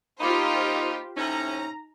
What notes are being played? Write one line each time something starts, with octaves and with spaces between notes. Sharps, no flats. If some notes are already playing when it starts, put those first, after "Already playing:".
A#3 D#4 F4 G4 C5 B5 C6 D6
A2 C3 C#4 D#4 A#5